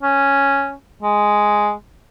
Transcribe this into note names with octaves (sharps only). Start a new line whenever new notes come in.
C#4
G#3